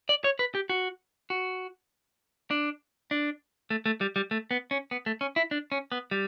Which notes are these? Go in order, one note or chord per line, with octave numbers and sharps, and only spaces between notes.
D5
C#5
B4
G4
F#4
F#4
D4
D4
A3
A3
G3
G3
A3
B3
C#4
B3
A3
C#4
E4
D4
C#4
B3
G3